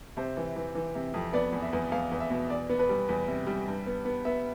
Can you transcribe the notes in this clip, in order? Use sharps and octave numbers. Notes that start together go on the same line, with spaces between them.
C3 C5
E3
E3
E3
C3
F2
B3 D5
E2
E5
E2
E2 F5
E2
E5
B2
E2 D5
B3
B4
G3
E2
C3
G3
G2
B3
B3
B3 E5